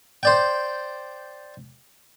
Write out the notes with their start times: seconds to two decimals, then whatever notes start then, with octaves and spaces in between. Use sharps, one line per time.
0.23 C5 D5 G5